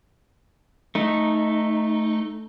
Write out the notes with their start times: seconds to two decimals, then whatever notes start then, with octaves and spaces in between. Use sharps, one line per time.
0.95 A3 D#4